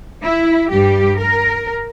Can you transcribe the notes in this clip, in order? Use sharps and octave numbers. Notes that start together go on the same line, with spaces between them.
E4
G2 G3 G4
A#4